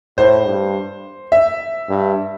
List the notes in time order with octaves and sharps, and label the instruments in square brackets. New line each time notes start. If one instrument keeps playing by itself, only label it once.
[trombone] A2 [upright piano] C5
[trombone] G2
[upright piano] E5
[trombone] G2